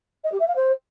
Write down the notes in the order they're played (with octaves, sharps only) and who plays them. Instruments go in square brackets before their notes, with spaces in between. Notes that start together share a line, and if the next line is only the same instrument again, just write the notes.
[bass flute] D#5
G4
E5
F5
C5